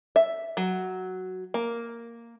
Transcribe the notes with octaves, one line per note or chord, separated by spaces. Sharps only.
E5
F#3
A#3